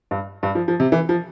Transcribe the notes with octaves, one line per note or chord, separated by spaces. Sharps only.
G2
G2
F3
F3
C3
E3
F3